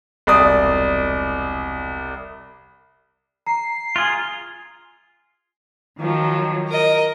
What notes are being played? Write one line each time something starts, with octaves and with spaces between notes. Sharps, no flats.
E1 C2 D5 D#6
A#5 C7
F4 G#4
D#3 F3 F#3
A#4 D#5